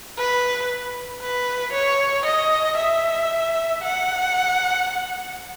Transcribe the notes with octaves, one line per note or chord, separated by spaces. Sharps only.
B4
B4
C#5
D#5
E5
F#5